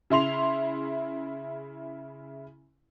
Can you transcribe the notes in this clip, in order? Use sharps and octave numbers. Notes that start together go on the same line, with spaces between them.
C#3 E4 C6 F7